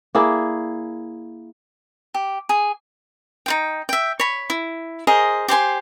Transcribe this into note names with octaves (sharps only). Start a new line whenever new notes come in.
A#3 E4 G#4 D5
G4
G#4
D#4 F4 G5
E5 G5
C#5 B5
E4
G#4 A#4 C5 D#5
G4 C5 G#5 C6